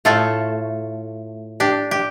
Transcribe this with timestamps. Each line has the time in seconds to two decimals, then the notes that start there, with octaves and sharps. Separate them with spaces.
0.05 A2 A3 F4 A4
1.60 D4 G4
1.91 G4